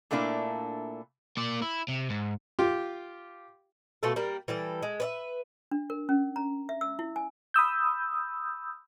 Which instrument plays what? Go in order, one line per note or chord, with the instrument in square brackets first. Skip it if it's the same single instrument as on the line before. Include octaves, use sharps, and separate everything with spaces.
[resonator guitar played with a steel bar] A#2 A3 A#3 D4 E4
[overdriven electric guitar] A#3 D5
E4
C3
G#2
[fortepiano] F4 G4
[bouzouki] B2 A3 F4 A4
G3 A#3
E3 G3 A4
G#3
B4 D5 E5
[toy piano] D4
A#4
C#4
A#5
E5
E6
E4
G#5
[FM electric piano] B5 D#6 E6 G6